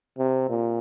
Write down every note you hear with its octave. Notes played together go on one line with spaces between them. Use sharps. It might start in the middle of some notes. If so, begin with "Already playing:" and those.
C3
A#2